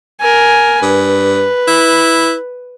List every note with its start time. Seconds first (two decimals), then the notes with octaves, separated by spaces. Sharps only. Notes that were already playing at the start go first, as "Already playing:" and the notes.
0.21 A#4 G#5
0.82 G2 B4
1.68 E4